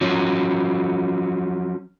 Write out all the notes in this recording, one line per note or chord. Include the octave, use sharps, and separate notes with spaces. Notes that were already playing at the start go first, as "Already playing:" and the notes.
F3 F#3 C#4